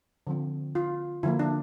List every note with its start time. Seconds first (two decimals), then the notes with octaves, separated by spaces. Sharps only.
0.27 D3 F3 C4
0.75 F4
1.23 D3 F3 A#3 E4
1.39 D4